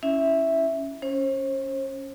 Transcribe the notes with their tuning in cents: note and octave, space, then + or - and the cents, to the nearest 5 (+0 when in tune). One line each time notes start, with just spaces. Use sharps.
C#4 +0 E4 +0 E5 +0
C#4 +0 C5 +40